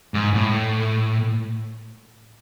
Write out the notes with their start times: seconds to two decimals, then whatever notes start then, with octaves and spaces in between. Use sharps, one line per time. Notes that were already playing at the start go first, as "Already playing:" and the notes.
0.14 G#2
0.34 A2